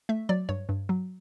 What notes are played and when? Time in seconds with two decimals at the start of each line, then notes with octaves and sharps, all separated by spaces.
0.09 A3 E5
0.29 F#3 D5
0.49 G2 C#5
0.69 G2
0.89 F#3